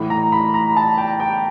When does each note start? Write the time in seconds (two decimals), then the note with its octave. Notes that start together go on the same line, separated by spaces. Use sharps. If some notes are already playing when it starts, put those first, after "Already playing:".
Already playing: A2 E3
0.10 A#5
0.32 B5
0.54 A#5
0.76 A5
0.98 G5
1.20 G5